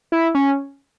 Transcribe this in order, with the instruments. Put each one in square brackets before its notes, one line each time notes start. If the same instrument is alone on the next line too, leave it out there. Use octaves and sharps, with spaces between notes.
[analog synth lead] E4
C#4